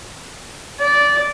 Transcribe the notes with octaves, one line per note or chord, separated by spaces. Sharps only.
D5